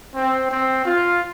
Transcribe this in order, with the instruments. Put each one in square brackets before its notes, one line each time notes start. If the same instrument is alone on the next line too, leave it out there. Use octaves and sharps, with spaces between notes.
[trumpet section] C4
C4
F4